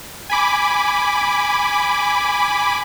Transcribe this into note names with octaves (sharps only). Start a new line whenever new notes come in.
G#5 B5 D6